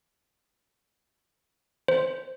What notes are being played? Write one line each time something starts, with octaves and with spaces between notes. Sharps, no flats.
C5